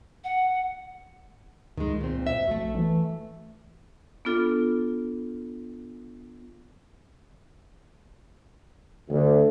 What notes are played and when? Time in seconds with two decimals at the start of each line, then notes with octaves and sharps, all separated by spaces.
0.24 F#5
1.78 C#2 D#3 G#3
2.01 A#2 C4
2.27 E5
2.47 A#1 A3 F#4
2.75 E3
4.25 B3 D4 F4 A4
9.09 D2